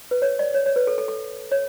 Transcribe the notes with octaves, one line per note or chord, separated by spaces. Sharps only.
B4
C#5
D5
C#5
C#5
B4
A4
A4
A4
C#5